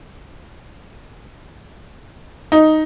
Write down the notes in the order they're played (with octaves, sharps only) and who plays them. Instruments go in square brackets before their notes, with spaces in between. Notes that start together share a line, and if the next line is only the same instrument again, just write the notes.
[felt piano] D#4